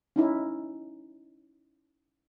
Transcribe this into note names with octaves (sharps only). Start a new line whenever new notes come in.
C#4 D#4 E4